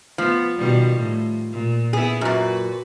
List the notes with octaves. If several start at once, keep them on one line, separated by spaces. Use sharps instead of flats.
F3 B3
B2 D#3 G3
A2
A#2
B3 E4 G#4
F#2 A#2 F#4 B4